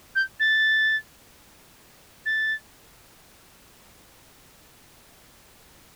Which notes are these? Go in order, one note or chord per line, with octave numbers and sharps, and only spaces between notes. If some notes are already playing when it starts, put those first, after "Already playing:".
G6
A6
A6